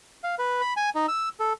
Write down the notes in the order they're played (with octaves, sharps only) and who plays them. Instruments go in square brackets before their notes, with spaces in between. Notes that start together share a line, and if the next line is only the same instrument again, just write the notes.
[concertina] F5
B4
B5
G#5
D#4
E6
A4